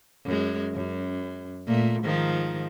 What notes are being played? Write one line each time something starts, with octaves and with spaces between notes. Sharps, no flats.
F#2 G#3
F#2
A#2 A3
G#2 D#3 F3